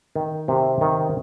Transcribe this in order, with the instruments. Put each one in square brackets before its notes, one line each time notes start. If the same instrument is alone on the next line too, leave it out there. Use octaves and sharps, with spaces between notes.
[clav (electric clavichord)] D#3
C3
D#3